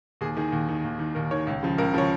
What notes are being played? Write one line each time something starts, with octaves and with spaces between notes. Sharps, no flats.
D#2 G#4
D#3 G#4
D#2
D#3
D#2
D#3
D#2 A#4
D#3 C#5
C#2
C#3 F3
C#2 A#4
C#3 F3 C#5